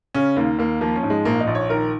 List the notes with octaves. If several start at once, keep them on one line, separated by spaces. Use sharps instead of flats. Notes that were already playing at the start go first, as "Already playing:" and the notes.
C#3 C#4
D#2 A#3
D#2 A#3
F3 A#3
C#4
G#2
G#3
A#1 A#3
D#4
A#1
C#5
D#3 A#4